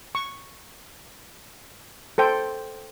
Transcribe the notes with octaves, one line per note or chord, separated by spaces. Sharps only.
C#6
A4 C5 G5